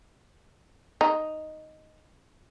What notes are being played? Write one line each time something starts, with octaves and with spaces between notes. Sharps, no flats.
D#4